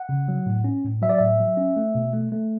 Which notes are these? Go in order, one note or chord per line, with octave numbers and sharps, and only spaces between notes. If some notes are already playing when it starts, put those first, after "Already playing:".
Already playing: F#5
C#3
F#3
A2
C#4
A2
F#3 E5
D5
A2 E5
F#3
C#4
A3
B2
A3
A3